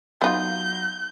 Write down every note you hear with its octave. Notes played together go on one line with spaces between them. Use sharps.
F#3 B3 D#4 F4 G6